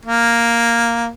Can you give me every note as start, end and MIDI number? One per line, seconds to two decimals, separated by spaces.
0.05 1.10 58